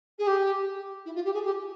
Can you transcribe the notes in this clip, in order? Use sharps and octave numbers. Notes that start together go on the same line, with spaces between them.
G#4
G4
E4
F4
G4
G#4
G4